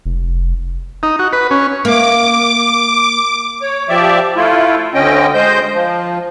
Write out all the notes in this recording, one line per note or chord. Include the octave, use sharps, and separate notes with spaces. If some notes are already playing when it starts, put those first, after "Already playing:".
F1
D#4
F#4
B4
C#4
A#3 D6
C#5
F3 G4 D5 E5
A3 E4 F4
D2 D3 C#4 D#5 G5
G#3 C5 D#5 G6
F3